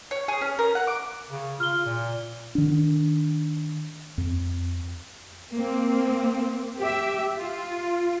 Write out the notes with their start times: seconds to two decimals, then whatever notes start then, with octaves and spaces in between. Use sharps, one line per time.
0.11 C#5
0.28 G#4
0.41 C#4
0.59 A#4
0.75 F#5
0.87 D6
1.30 C#3
1.60 F4 F6 G7
1.86 A#2
2.55 D#3 D4
4.18 F2
5.54 A#3 C4
6.78 G4 E5
7.39 F4